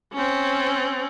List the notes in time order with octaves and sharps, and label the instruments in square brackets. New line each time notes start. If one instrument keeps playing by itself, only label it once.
[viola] C4 C#4